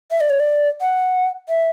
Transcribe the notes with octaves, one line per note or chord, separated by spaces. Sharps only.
E5
D5
C#5
D5
F#5
E5